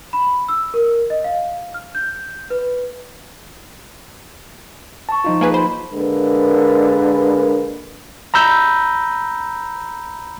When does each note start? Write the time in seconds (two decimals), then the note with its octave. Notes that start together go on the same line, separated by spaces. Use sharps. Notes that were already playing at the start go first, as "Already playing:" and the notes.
0.13 B5
0.48 E6
0.74 A#4
1.10 D#5
1.24 F5
1.74 F6
1.95 G6
2.50 B4
5.09 A5 C#6
5.24 F3 D#4 F4
5.41 A#3 G#4 B4
5.54 C5 B5
5.92 D3 G#3 A#3 A#4 B4
8.34 A#5 B5 E6 G6